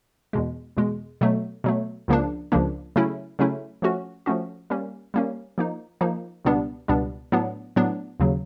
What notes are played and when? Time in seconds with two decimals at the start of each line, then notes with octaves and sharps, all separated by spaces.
0.33 E2 B2 G#3
0.77 E2 B2 G#3
1.21 B2 F#3 A3
1.64 B2 F#3 A3
2.08 C#2 C#3 F3 A#3 D4
2.52 C#2 C#3 F3 A#3 D4
2.96 C#3 F#3 A3 C#4 E4
3.39 C#3 F#3 A3 C#4 E4
3.82 F3 A3 C#4 F#4
4.26 F3 A3 C#4 F#4
4.70 G3 A#3 C#4
5.14 G3 A#3 C#4
5.58 F3 A#3 D#4
6.01 F3 A#3 D#4
6.45 C#2 B2 G3 B3 D4
6.88 C#2 B2 G3 B3 D4
7.32 A2 F#3 B3 D4
7.76 A2 F#3 B3 D4
8.20 D#2 C#3 F#3